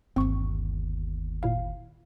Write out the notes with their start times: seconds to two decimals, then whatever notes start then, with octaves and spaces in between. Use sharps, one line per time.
0.16 G1 D#2 C4 C#6
1.43 A#2 E4 F5